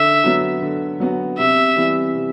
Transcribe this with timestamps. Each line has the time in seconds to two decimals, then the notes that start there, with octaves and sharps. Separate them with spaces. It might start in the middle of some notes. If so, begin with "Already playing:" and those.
Already playing: D3 E5
0.24 F#3 B3 F#4
0.62 D3
1.00 F#3 B3 F#4
1.38 C3 E5
1.76 E3 G3 B3
2.14 C3